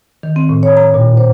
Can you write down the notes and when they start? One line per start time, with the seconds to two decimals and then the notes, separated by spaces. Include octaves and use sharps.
0.23 D#3
0.36 C4
0.49 A2
0.63 C#5
0.77 A#5
0.94 A#2
1.17 C5